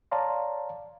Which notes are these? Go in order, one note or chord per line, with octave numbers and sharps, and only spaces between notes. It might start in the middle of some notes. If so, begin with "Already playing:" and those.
C#5 D5 F5 A5 A#5 C6